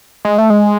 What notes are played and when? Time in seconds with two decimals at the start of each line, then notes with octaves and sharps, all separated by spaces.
0.25 G#3
0.38 A3
0.50 G#3